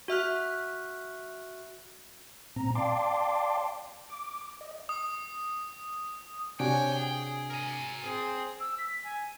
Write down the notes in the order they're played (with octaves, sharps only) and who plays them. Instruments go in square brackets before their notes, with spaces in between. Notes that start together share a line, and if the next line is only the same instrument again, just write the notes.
[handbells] F#4 E5 F6 F#6
[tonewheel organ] A#2 C4 A#5
D5 F5 G5 A5 C6 D6
D6
D#5
[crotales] D#6
[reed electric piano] C3 D4 F#4 [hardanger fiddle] C#5 G#5 [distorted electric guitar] G5
[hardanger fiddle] G#4
[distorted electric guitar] A#4 G#5
[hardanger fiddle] C4 G#4
[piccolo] E6
B6
G#5